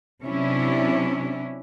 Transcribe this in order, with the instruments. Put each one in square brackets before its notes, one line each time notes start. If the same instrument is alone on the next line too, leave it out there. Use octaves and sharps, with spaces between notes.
[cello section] C3 F#3 C#4 D4 E4